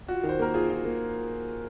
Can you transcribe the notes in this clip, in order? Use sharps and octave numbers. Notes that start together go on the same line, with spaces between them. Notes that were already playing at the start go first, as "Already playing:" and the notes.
F4 F#4
D#3
C5
A#3 A#4
F4 G#4
F4
A#3